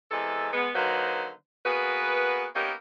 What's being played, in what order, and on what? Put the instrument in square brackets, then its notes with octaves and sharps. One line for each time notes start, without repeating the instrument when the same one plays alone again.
[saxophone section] E2 C3 E3 G#3 A4
G#3 B3
D3 D#3 F#3 A#3 B4 C5
A#3 B3 F#4 G#4 B4
A#3 B3 C#4 D#4 G4 A#4